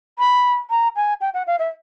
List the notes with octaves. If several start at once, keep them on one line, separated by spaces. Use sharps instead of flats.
B5
A#5
G#5
G5
F#5
F5
E5